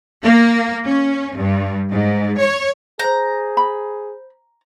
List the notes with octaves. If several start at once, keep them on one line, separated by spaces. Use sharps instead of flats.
A#3
C#4
G2
G#2
C#5
G#4 C5 A#5 G6
B5